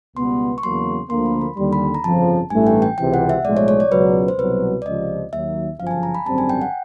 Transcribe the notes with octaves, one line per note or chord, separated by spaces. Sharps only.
C#2 B2 G3 B3 C6
C#6
E2 C#3 F#3 A#3 C6
D2 D3 F3 A#3 C6
B5
B5
D#2 D3 G3 C6
B5
A#5
G1 F2 C#3 F3 A5
A1 G2 E3 A3 G#5
G5
G5
C#2 C3 E3 G5
F#5
E5
B1 A2 F3 G#3 D5
C#5
C#5
D5
C#2 B2 F#3 B4
C5
C2 B2 F#3 B4
D5
C#2 C3 F3 D#5
D#2 D#3 F#3 E5
G1 F#2 C#3 F3 F5
G#5
A5
A#5
B5
G#1 F#2 D3 G3 C4 A5
G#5
G5
F#5